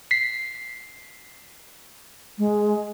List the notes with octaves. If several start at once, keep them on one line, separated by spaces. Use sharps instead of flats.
B6 C7
G#3